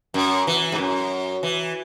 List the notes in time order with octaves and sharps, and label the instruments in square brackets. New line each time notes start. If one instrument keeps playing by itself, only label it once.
[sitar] F#2
E3
G#2
F#2
E3